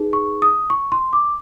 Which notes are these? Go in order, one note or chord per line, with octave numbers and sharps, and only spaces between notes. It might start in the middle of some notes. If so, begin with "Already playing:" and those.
Already playing: D#4 G#4 B4
C#6
D#6
C#6
C6
D6